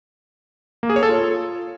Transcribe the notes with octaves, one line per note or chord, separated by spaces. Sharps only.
A#3
G#4
C#5
A4
F4